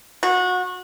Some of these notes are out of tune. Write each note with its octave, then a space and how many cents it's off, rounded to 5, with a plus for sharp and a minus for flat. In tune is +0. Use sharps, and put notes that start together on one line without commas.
F#4 -25